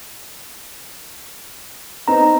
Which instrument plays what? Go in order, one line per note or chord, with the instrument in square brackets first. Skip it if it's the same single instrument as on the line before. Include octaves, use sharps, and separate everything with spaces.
[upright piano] B3 C4 D#4 [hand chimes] A#5